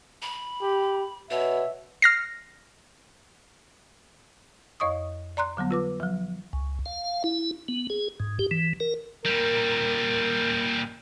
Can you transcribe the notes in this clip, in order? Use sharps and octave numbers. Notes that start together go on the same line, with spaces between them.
B5
G4
B2 C#5 E5
F6 A#6 C7
F2 C#5 D#5 C#6 D#6
D5 A#5 C6 F#6
D3 F#3 G3 B3
F4 B4 D6
F3 F#3
C#2
F5
E4
B3
G#4
G#2
G4
E3
A#4
A#2 G3 A#4